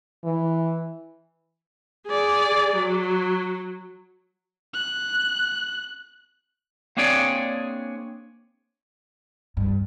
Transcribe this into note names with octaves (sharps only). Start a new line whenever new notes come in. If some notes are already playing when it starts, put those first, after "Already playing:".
E3
G#4 D5
F#3
F#6
A#3 C4 D4 G#4 C#5 D5
G2